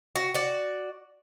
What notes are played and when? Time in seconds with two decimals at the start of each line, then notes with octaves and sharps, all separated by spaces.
0.16 F#4
0.34 F#4 D5